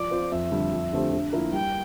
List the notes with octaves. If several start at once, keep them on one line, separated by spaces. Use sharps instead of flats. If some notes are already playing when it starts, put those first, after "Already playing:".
Already playing: F3 D5
C4 F4 C5
F2 E5
D3 G3 D4
F2
D3 A3 C4 G4
D3
F3 A#3 E4 A#4
G3 G5